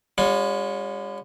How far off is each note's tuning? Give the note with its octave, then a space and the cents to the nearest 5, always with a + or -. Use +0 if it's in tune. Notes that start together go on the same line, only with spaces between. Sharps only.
G3 +45 C#4 +0 F4 +45